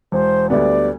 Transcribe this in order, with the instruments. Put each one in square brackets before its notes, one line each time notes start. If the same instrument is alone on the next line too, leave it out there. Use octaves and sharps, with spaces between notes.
[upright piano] E1 [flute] C5
[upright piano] D2 D3 G3 B3 [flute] D5